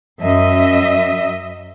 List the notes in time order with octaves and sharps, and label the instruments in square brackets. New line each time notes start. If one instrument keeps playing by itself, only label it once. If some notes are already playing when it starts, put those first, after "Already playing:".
[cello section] F#2 D#5 E5